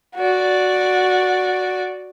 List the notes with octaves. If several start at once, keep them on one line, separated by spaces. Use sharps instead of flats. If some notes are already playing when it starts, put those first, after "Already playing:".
F#4 D5